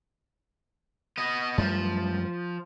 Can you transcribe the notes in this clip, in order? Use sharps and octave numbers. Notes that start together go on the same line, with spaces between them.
B3 D#5
F#2 F3 G3 A3